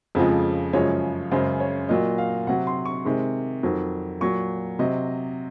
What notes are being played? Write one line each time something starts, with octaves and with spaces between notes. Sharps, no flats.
F2 C#3 F3 G#3
F#2 C#3 F3 G#3 C#5
F#2 C#3 G#3 C5
C#5
A#2 F#3 D#5
F5
C3 F#3 F#5
C6
C#6
C3 D#3 G#3
F2 D#3 F#3
A#2 F#3 C#6
C3 F#3 D#5